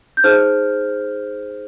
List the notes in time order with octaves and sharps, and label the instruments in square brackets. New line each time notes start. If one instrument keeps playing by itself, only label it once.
[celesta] G6
D#4 G#4 C5 F6